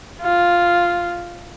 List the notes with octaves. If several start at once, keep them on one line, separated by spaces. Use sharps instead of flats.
F4